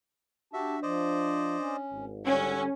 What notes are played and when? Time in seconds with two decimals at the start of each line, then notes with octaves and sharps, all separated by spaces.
0.53 D4 F#4 G4 E5 A5
0.83 F3 C5 D5 D#5
1.59 C#4
1.92 G#1
2.26 D3 G3 C#4 F#5 E6